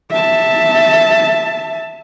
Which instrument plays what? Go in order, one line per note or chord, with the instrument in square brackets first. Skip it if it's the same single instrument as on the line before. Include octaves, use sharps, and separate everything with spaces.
[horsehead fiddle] E5 A5